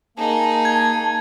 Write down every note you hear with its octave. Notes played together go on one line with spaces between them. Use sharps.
A#3 D#4 G#4 A5
G#6